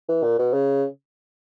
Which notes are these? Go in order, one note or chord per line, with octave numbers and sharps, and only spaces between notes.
E3
A#2
B2
C#3